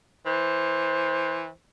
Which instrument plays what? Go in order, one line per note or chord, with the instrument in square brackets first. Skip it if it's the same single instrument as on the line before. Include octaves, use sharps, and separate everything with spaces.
[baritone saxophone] E3 [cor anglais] C5